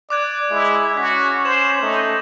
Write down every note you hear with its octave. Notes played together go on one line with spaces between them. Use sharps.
D5 D6 F#6 G#6
G#3 E4
C#4 F#4 B6
C5 G#6 E7 F#7
A3 D#4